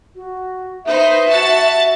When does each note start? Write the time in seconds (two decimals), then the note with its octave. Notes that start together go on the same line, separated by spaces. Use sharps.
0.15 F#4
0.85 D#4 B4 C5 E5
1.28 F#4 A5 A6
1.62 E5